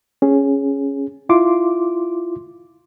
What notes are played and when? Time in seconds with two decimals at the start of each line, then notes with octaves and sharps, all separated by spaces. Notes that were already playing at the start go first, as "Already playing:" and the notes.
0.22 C#4 G#4
1.29 E4 F4 C6 D6